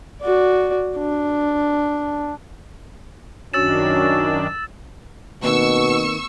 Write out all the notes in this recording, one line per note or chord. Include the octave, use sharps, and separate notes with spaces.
F#4 D5
D4
F#2 D#3 C#4 D4 F#4 E6 A6 E7
B2 D#3 A#3 C4 B4 C#6 E6